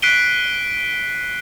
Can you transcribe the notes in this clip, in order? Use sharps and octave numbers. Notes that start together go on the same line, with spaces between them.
F#6 B6 C7 D7 D#7 G7